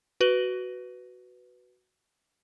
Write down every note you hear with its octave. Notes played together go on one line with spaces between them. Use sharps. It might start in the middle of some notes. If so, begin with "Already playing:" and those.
F#4 B4 F#7